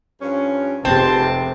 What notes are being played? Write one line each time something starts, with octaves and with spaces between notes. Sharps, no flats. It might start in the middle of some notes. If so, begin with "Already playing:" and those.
G2 F3 C#4
F1 G#2 C3 C4 B4 A5